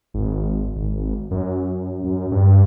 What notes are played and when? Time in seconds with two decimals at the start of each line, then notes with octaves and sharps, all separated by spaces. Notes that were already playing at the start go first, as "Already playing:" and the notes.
0.14 G#1
0.76 G#1
1.31 F#2
2.05 F#2
2.32 G2